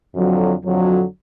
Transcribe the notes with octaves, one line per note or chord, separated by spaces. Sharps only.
F2 D3 F#3
F2 D3 F#3